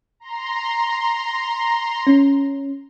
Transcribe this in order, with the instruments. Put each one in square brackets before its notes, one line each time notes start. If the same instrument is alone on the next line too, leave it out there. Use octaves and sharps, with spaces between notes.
[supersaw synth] A#5 C6
[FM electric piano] C#4